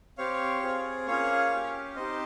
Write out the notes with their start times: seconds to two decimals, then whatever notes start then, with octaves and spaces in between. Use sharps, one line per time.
0.18 C4 G4 C#5 F5
0.63 C4 F4 G#4
1.07 A#3 C#4 F4 G#4 C#5 F5
1.52 C#4 G4
1.96 C4 D#4 G4 C5 D#5